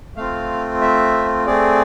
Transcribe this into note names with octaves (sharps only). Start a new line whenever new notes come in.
A3 C4 F4 F5
E5
A3 C4 G#4 D5